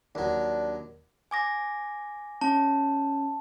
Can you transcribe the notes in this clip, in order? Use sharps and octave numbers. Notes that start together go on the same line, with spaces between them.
D#2 F#3 D4
G#5 D6 A#6
C#4 A5